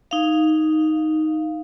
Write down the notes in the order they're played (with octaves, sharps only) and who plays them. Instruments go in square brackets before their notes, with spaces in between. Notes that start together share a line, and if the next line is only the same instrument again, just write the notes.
[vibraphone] D#4 F5